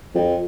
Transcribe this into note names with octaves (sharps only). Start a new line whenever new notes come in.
F2